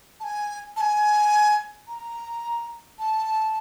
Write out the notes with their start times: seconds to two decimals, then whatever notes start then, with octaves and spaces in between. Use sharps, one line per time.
0.20 A5
0.24 G#5
0.77 A5
0.81 G#5
1.88 A#5
2.99 A5